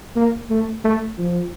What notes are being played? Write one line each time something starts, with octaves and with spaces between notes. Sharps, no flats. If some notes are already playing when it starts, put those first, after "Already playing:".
A#3
A3
A3
F3